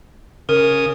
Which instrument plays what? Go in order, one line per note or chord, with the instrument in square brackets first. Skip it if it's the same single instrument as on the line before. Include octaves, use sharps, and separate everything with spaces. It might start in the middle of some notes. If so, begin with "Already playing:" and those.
[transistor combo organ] C#3 D#6 [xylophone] A#4